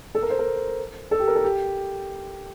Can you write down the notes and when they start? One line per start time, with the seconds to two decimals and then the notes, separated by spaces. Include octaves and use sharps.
0.15 A4
0.23 A#4
0.30 C5
0.39 A#4
1.11 A4
1.20 G4
1.28 A#4
1.36 A4
1.44 G4